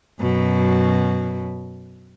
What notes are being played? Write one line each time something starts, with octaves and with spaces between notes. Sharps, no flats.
F#2 B2